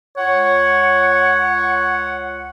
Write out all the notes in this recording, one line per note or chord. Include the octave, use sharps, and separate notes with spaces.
C#2 F4 C#5 F#5